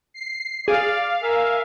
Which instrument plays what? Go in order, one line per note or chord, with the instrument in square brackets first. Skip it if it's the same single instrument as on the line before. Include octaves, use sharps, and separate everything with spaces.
[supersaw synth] C7
[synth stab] G#4 [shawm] D5 [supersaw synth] F5
[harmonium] A#4 G#5 [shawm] E5